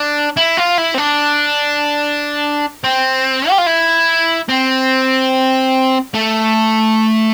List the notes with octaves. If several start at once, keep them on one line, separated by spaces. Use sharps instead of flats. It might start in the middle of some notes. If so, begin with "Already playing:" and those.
Already playing: D4
E4
F4
E4
C4
D4
C4
G4
F4
E4
C4
A3